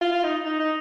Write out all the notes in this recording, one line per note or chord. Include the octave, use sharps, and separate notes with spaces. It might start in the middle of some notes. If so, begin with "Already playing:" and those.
F4
F4
D#4
D#4
D#4